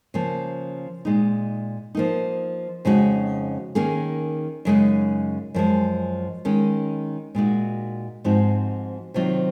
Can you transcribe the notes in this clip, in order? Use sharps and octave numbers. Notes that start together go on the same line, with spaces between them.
C#3 F3 A#3
A#2 G#3 D#4
F3 A#3 D#4
F2 C#3 G#3 D#4 F#4
D#3 A#3 C#4 G#4
F#2 C#3 G#3 D#4
F#2 F3 G#3
D#3 G#3 C#4
A#2 G#3 D#4 F#4
G#2 F3 C4 D#4 F#4
C3 D#3 F#3 C4 F4